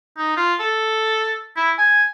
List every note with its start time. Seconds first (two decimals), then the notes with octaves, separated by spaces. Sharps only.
0.17 D#4
0.37 F4
0.60 A4
1.56 E4
1.78 G#5